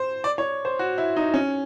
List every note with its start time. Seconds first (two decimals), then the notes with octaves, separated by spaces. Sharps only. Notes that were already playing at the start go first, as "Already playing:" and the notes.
Already playing: C5
0.24 D5
0.38 C#5
0.65 C5
0.79 F#4
0.98 E4
1.16 D#4
1.34 C#4